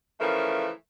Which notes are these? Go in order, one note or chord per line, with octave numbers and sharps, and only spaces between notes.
C#3 E3 F3 A3 C#4 A#4